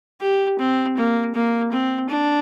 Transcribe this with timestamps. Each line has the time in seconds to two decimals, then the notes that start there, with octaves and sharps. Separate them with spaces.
0.21 G4
0.59 C4
0.97 A#3
1.35 A#3
1.72 C4
2.10 D4